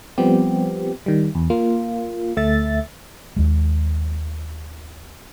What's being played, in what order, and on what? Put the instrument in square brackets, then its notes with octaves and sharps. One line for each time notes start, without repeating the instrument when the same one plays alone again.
[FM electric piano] F3 G3 B3 C4 G4
D#3 G3
E2
A#3 F4
D2 A3 E5 A6
[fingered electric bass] D#2 G#3